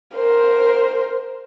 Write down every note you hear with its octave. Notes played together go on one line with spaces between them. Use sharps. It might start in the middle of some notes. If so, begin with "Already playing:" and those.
A#4 C5